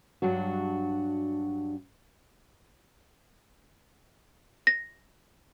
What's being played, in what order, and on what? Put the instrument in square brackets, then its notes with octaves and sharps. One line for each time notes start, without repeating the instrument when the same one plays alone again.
[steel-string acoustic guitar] G2 F#3 D4 F#4
[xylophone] A#6